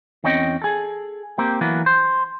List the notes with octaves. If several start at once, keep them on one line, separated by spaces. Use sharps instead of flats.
E2 C4 C#4 D#5 G5
G#4 A4
A#3 C4 G4
E3 F#3 A#3 B3
C5